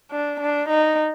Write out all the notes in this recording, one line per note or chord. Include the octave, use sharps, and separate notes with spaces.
D4
D4
D#4